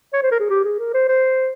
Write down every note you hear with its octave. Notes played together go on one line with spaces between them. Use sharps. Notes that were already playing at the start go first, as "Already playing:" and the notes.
C#5
C5
A#4
G#4
G4
G#4
A#4
C5
C5